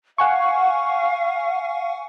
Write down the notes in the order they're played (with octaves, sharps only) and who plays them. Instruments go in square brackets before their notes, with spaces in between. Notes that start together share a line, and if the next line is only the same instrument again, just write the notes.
[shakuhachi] F5 [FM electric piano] F#5 G#5 C#6